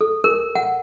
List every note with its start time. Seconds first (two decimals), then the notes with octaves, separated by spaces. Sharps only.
0.01 A4
0.24 A#4
0.55 F#5